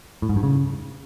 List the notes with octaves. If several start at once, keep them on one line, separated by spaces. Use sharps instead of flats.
A2
G#2
G2
C#3